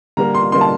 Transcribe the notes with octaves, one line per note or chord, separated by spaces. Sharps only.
D3 G3 A#3 A#5
C6
D3 G3 A#3 C6
A5